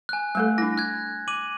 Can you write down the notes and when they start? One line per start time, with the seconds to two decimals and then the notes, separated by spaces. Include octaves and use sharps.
0.09 G#5 F#6
0.35 G3 A3 A4 F#6
0.58 D4 E4 A#6
0.78 F#6 G#6
1.28 D6 D#7 F#7